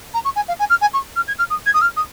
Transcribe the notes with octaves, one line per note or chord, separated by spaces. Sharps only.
A#5
C#6
G#5
F5
G#5
F6
G#5
C#6
F6
G#6
F6
D#6
G#6
D#6
F6
D#6